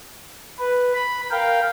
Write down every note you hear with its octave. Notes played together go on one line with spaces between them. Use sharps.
B4
B5
A#4 F5 G5